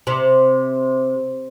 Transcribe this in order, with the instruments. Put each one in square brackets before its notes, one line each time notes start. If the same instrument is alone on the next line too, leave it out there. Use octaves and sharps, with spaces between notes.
[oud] C3